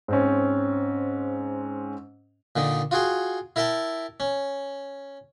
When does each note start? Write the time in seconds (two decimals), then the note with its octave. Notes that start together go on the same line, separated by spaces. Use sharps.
0.08 G#2 C4 C#4
2.56 A#2 D3 D#3 D#4
2.91 F4 F#4 G#4 G5
3.56 E4 A#4 E5 G5 A5
4.20 C#4